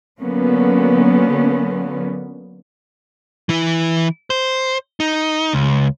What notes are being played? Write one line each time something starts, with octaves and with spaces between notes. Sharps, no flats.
D3 F#3 A#3 B3 C#4
E3 E4
C5
D#4
C#2